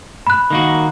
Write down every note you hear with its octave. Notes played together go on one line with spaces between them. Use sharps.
B5 F#6
D#3 A#3 F#4